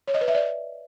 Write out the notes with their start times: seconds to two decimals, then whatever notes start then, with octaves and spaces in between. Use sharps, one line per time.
0.08 C#5
0.14 D#5
0.21 B4
0.28 E5
0.35 D5